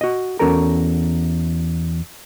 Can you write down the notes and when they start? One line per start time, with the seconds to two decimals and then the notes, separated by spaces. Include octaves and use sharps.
0.01 F#4 D#5
0.39 E2 C#4 F#4 A4 A#4 A#5